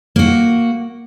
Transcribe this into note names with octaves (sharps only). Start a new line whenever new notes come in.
A#3 F#4